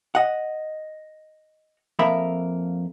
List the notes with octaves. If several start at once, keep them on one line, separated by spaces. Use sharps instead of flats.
D#5 F#5
F2 A#3 E5 B5